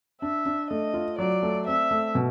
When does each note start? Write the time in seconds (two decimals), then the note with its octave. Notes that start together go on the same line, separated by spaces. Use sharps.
0.22 D4 E5
0.46 D4
0.70 A3 D#5
0.94 F4
1.18 F#3 D5
1.43 A3
1.67 C4 E5
1.91 A3
2.15 B2